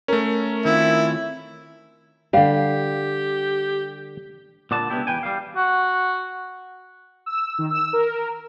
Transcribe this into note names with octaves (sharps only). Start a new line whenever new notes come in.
A3 C#4 A#4
D#3 C4 E4 F4
D3 G3 G4 F5
A#2 D3 D5 F#5 A5
C#2 B3 C#4 D4 E4 G4
E2 B4 G5 G#5
G3 F5
F#4
E6
D#3
E6
A#4